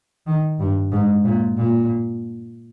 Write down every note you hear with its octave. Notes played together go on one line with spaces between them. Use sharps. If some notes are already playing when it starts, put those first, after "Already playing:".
D#3
G2
G#2
A#2
A#2